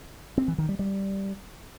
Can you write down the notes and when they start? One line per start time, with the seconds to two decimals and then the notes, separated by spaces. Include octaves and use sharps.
0.38 C4
0.48 E3
0.58 D#3
0.69 G3
0.79 G3